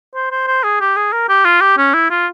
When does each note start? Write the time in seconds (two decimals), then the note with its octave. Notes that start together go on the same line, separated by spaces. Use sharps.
0.15 C5
0.31 C5
0.48 C5
0.64 G#4
0.81 G4
0.96 G#4
1.13 A#4
1.29 G4
1.45 F4
1.61 G4
1.78 C#4
1.94 E4
2.10 F4